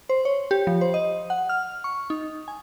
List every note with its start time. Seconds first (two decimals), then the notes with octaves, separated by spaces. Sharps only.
0.09 C5
0.25 C#5
0.51 G4
0.67 F3
0.81 C5
0.94 D#5
1.30 F#5
1.49 F6
1.84 C#6
2.10 D#4
2.48 G#5